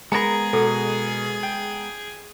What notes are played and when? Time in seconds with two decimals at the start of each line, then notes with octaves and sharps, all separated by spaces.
0.12 G#3 B3 G#4 A#4 A#5 B5 C#7
0.53 B2 A4
1.43 G5